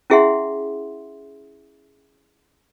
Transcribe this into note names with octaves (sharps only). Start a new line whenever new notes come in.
C#4 E4 G#4 E5 F#5 C6